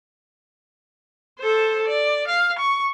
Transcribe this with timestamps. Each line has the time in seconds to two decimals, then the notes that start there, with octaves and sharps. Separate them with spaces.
1.40 A4 C5
1.88 D5
2.28 F5
2.59 C#6